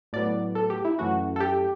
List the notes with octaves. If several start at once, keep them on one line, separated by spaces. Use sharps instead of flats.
A2 F#3 B3 D5
A4
G4
E4
F#2 E3 A3 C#4 F#4
A4
G4